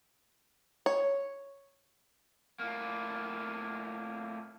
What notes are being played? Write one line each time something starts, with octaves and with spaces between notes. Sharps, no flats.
C#5
A2 A#3